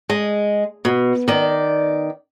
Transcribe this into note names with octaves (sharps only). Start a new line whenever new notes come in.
G#3
B2
D#3 D5